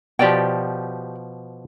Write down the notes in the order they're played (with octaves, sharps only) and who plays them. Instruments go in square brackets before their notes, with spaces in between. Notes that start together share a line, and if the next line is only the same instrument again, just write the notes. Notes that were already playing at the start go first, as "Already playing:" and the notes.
[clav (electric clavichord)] B2 F3 [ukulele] G4 D5 G5